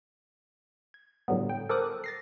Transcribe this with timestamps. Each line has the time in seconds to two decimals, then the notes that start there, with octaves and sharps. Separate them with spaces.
0.94 G#6
1.28 A2 D3 F#3 G3 B3
1.49 G5
1.69 A4 A#4 C5 D6 D#6 F#6
2.04 A6 A#6 C7